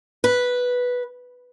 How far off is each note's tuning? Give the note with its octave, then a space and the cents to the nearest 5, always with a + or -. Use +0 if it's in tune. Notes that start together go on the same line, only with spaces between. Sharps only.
B4 -5